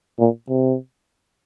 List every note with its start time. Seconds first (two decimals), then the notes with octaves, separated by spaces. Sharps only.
0.19 A#2
0.49 C3